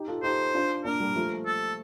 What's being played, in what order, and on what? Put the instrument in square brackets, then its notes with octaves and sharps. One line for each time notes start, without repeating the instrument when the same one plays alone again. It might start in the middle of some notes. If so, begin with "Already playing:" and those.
Already playing: [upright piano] D#4 G4
F4 A4
[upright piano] D#4 G4 [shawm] C5
[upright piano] D4 F4
[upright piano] A#3 D4 [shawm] A#4
[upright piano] G3 A#3
F3 A3
[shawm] A4